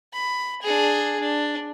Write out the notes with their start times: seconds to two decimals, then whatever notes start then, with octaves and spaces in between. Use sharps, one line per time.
0.13 B5
0.62 D4 G#4
1.20 D4